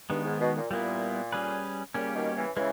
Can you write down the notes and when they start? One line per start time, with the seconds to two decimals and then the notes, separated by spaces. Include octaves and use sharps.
0.10 G2 D#3 G#3 B3
0.25 G#2
0.40 B2
0.56 A#2
0.71 A#2 G3 B3 E4
1.32 G3 C#4 G#4 B4
1.94 A#2 C#3 G3 A#3 C#4 G4
2.15 B2 D#3
2.36 C#3 E3
2.56 C#3 E3 G#3